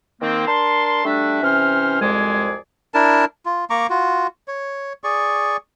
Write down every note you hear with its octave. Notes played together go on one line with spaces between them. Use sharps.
D#3 A#3 C4
D4 A#4 A5 C6
G3 A3 D4 F#4 E5
C3 E3 C#4 C5 F6
C2 F2 G#3 G#4 D5 G#5
D4 E4 A#4 A5
F4
A#3 A#5 C#6 D6
F4 F#4
C#5
G#4 D5 C#6